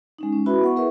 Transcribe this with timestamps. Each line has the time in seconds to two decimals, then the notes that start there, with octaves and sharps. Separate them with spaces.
0.19 G#3 C#4 D#4
0.32 C#4
0.46 E4 F#4 B4 E5 B5
0.62 B3 F#5 C#6
0.76 E4 G#4 A#4 B4 E5